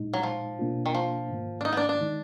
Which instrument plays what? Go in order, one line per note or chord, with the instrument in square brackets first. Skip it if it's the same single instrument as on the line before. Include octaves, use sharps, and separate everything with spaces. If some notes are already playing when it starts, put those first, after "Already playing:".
Already playing: [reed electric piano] A#2 G#3 D#4
[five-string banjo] F#3
F3
[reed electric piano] B2 A#3 D4 F4
[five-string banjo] D#3
F3
[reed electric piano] G#2 D#3 A#3
[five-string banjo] D4
D#4
B3
D4
D4
[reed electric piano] D#3 G#3 D#4